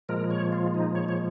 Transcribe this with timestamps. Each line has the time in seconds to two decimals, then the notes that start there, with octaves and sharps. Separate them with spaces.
0.09 A#2 F3 G#3 A#4
0.30 C#5
0.52 F4
0.74 D#4
0.95 C#5
1.09 C#5